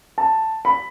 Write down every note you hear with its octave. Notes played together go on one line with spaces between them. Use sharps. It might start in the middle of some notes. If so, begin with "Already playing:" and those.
A5
B5